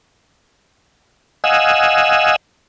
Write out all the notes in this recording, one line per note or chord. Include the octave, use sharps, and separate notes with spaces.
D#5 F5 F#5 G#5 E6